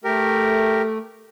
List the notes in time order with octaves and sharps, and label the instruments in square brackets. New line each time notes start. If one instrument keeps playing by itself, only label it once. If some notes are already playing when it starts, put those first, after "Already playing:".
[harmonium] A3 [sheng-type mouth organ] G4 A#4